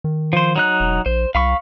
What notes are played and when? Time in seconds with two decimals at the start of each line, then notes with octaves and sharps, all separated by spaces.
0.04 D#3
0.33 F3 C5
0.56 F#3 D#4 F#6
0.80 E1
1.06 A#1 C5
1.35 C2 F5 B5 C#6